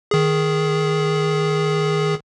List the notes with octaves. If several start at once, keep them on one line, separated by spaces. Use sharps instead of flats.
D#3 G#4